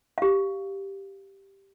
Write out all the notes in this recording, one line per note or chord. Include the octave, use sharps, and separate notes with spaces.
G4 F5